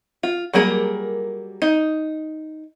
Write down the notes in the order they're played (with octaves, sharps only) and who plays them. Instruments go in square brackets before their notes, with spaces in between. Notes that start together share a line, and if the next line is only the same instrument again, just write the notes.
[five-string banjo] F4
F#3 G3 A#3 G#4 A#4
D#4